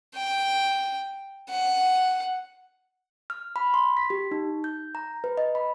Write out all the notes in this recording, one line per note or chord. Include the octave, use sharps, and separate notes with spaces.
G5
F#5
F6
B5
C6
B6
G4
D#4
G6
A#5
B4
D#5
B5